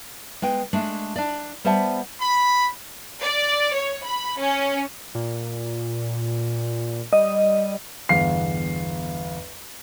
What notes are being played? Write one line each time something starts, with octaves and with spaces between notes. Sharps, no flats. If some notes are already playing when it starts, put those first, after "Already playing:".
G#3 B3 G5
G#3 A3 D4
D4 D5
G3 B3 C5 E5 F#5 A5
B5
D5
C#5
B5
C#4
A#2
G3 D#5
G1 E2 F5 C7